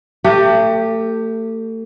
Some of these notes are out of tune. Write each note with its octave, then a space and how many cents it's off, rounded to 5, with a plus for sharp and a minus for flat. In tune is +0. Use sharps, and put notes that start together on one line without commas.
A3 +35 G4 +0